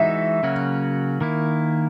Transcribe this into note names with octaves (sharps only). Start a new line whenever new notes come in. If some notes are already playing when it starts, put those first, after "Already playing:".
Already playing: E3 G#3 D#4 F#4 E5
C#3 F#3 A#3 C#4 F#4
D#3 A#3 E4